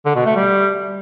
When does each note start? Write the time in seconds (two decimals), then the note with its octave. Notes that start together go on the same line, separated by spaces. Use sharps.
0.05 D3
0.15 B2
0.26 A3
0.36 G3